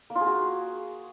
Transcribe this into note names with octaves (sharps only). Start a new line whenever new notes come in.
A#3
F4
G#4
F#4